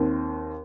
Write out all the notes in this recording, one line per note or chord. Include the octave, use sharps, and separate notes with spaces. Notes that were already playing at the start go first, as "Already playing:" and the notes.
Already playing: D#2 D#3 C4